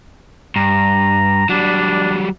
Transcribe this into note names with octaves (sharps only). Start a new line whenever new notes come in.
G2 A#5
F#3 G3 D4